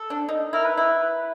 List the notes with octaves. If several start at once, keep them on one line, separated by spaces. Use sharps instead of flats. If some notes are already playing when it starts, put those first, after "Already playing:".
Already playing: A4
D4
D#4
E4 A#4
B4
E4
B4